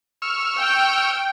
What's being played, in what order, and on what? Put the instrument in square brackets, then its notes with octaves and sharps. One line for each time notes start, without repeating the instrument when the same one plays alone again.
[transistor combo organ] C#6 E6 F6
[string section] G5